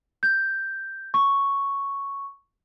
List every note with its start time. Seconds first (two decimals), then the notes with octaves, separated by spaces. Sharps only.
0.23 G6
1.14 C#6